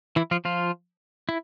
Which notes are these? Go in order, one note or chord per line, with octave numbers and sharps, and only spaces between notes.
E3 E4
F3 F4
F3 F4
E4